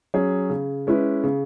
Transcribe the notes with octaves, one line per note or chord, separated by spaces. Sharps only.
F#3 C#4 G#4 C#5
C#3
G#3 C#4 E4 B4
C#3